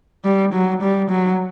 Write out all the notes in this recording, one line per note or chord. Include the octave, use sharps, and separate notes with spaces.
G3
F#3
G3
F#3